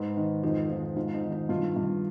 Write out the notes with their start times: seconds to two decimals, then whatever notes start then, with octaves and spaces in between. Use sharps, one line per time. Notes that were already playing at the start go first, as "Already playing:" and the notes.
Already playing: G#2 B4
0.17 D#3
0.43 F2 D#4
0.69 F3 D#4
0.96 G#2 F4
1.14 D#4
1.23 D#3
1.32 D#4
1.49 G2 F4
1.76 G2